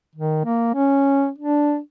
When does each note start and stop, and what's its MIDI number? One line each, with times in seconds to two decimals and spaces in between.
0.15 0.42 51
0.45 0.71 58
0.75 1.29 61
1.38 1.78 62